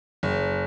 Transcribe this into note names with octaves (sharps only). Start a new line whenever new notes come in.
F#1